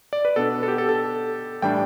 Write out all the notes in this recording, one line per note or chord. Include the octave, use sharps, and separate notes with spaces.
D5
B4
B2 B3 D4 A4
A4
G4
A4
A4
A2 E3 G3 D4 G5